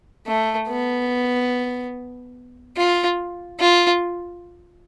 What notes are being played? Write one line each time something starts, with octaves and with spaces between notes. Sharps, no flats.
A3
B3
F4
F4